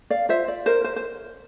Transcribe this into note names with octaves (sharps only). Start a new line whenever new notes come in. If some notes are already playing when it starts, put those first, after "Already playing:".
D5 F5
F4 C5 E5
D5
A#4 C5
C5
C5